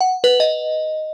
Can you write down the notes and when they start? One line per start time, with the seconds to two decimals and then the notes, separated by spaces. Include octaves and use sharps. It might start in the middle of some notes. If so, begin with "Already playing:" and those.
0.01 F#5
0.24 B4
0.40 D#5